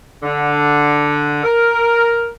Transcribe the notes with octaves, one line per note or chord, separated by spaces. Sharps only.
D3
A#4